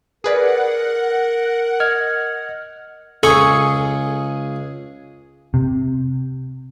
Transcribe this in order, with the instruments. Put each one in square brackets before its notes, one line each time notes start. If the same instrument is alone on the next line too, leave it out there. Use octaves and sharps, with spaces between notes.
[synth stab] G#4 B4 D5 [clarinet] A#4 [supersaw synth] F#5
[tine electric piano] D#5 F6 G#6
[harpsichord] C#2 [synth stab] G#4 [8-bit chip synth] A4 [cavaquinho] C#6
[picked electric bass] C3